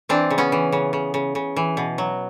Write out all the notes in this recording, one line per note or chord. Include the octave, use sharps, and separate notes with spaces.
E3 C4 D4
C#3
B3 C#4
E3
C#3
C#3
C#3
C#3
E3
B2
F#3